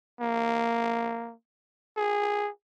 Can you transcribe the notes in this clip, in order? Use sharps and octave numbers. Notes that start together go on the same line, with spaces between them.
A#3
G#4